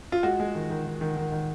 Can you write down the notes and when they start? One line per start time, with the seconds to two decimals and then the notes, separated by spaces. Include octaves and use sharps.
0.12 F4
0.23 G#3 F#4
0.40 G#3
0.55 D#3
0.70 D#3
0.86 D#3
1.01 D#3
1.17 D#3
1.32 D#3